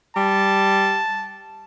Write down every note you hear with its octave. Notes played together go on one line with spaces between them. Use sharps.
G3 A5